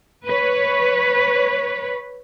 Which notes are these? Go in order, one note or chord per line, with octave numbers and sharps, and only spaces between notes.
B4 C#5